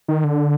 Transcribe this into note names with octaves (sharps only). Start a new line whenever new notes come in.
D#3
D3